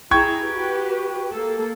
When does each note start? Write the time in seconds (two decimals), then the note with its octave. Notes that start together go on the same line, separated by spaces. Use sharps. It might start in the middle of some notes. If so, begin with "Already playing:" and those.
0.11 E4 G#4 G5 A#5 C#6 G#6
0.43 F#4 G4 B4
1.32 A#3 A4